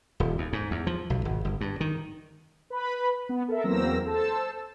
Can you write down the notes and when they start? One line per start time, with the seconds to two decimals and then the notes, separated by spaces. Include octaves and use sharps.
0.20 D#1
0.38 D#2
0.53 G#2
0.71 E2
0.87 F3
1.10 B1
1.25 G#1
1.45 G1
1.61 G2
1.81 D#3
2.70 B4 B5
3.29 B3
3.48 A4 A#4 E5
3.64 E2 F#3 A#3 C4 E6 A#6
4.05 A4 C5 A5 E6